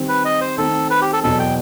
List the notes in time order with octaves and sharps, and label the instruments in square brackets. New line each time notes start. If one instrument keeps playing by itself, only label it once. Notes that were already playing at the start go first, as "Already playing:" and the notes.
Already playing: [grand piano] D#3 G3 C4
[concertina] B4
D#5
C5
[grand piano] D#3 A3 C4 [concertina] A4
[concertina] B4
G4
A4
[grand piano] E2 B2 F#3 B3 [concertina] A4
[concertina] G5